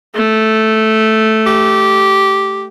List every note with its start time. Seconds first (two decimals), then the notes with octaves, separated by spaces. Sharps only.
0.15 A3
1.46 G4